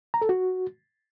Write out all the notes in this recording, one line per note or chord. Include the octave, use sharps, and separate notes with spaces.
A#5
A4
F#4